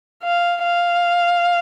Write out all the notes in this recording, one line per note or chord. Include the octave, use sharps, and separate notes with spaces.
F5
F5